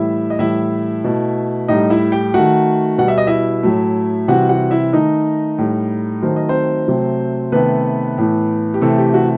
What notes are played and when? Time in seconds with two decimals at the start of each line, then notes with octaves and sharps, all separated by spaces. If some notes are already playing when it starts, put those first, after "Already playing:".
Already playing: A2 E3 G3 E4 E5
0.30 D#5
0.39 A2 E3 G3 E4 E5
1.04 B2 A3
1.68 A2 G3 D#4 D#5
1.90 E4 E5
2.12 G4 G5
2.34 D#3 A3 F#4 F#5
2.98 B2 G3 F#5
3.08 E5
3.18 D#5
3.27 E4 E5
3.63 A2 F#3 A3
4.28 C3 E3 G3 F#4 F#5
4.49 F#4 F#5
4.71 E4 E5
4.93 D#3 A3 D#4 D#5
5.58 A2 G3
6.22 D#3 F#3 A3 C5
6.36 D#5
6.49 C4 C5
6.88 C3 F#3 A3
7.52 C3 D#3 A3 B3 B4
8.18 A2 E3 A3
8.74 G4
8.81 C3 E3 A3 A4
8.98 G4
9.14 F#4